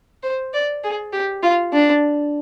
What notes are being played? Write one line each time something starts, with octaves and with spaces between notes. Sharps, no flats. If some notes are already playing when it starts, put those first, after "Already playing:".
C5
D5
G#4
G4
F4
D4